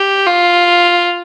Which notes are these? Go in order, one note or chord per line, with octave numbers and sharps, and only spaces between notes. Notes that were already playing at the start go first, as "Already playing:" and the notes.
Already playing: G4
F4